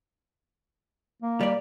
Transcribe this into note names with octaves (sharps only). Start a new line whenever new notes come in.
A#3
G3 D5